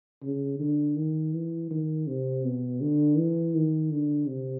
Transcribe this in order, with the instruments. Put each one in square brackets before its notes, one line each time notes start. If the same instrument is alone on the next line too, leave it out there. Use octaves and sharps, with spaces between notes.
[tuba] C#3
D3
D#3
E3
D#3
C3
B2
D3
E3
D#3
D3
C3